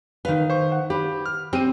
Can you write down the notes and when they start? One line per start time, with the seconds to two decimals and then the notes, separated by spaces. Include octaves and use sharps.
0.25 D#3 B4 F5
0.50 C5 C#6
0.72 F#5
0.90 G4 B4
1.26 F6
1.53 C4 G4 C5 D#7